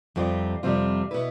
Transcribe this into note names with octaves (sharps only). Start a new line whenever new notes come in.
F2 C3 G3 C4 F4
F2 C3 G3 C4 F4
B2 B3 E4 B4